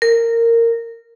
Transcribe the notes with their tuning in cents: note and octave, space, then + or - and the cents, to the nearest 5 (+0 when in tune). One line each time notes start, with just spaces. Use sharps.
A#4 -15